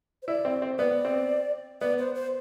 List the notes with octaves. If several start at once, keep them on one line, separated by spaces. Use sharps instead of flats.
C5
E4 D5
C4
C4
B3 D5
C4
B3 D5
C5
C5